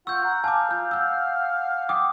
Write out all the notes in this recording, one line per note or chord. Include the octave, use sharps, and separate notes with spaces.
F4 F#5 C#6 E6 G6
F#5 A#5
F5 G#5 A5 D6
F4 G6
F#5 E6 G6
G5 D6 D#6